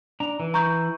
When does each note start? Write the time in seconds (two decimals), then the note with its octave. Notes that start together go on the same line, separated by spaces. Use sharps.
0.20 D4 A#5
0.40 E3
0.54 A#5 C#6 G6